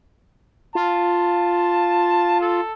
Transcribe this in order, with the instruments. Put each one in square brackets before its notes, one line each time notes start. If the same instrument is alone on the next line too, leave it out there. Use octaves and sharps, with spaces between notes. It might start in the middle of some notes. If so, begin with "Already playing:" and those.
[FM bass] F4 [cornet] A5
[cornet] A4